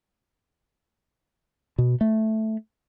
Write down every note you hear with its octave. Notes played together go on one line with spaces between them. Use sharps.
B2
A3